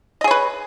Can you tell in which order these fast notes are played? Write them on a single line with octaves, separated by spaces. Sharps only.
D#5 G#4 C#5 B4